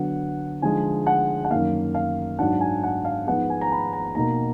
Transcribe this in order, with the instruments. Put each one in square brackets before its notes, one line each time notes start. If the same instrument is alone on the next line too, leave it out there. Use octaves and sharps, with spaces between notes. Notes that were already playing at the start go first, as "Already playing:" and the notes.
Already playing: [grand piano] D3 F#3 B3 F#5
D3 F3 G#3 D#4 G#5
F#5
F#5
F#2 D#3 A#3 F5
F5
G#2 F#3 D4 F#5
G#5
F#5
F5
G#2 F3 G#3 B3 F#5
G#5
A#5
B5
A#5
B2 A#3 D#4 A#5